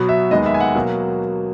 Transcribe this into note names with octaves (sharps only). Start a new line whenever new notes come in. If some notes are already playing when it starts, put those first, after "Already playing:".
Already playing: B2 F#3 B3
E5
D#2 D#3 G#3 B3 D#5
E5
G#5
F#5
B2 F#3 A#3